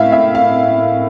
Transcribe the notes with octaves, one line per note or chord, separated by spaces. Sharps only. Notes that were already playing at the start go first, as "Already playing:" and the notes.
Already playing: A2 E5 F5
E5
F5